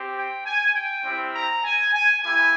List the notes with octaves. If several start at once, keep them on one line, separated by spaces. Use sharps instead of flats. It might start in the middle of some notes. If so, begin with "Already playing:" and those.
Already playing: C4 G4
G5
G#5
G5
G3 C4 E4 G4
A#5
G#5
G#5
A#3 E4 G4 G#5